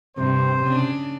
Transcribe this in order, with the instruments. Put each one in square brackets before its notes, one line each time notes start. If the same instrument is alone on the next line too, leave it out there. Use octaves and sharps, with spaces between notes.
[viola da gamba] G2 [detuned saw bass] C3 [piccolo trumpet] C5
[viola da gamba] C#3 D4